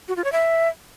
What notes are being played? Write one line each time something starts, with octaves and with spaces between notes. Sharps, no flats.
F#4
F4
C#5
E5